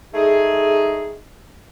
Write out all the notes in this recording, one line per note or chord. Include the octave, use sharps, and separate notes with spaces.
G#3 A3 D#4 G#4